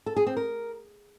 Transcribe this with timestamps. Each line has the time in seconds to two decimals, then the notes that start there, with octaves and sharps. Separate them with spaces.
0.06 A4
0.16 G#4
0.27 C4
0.37 A#4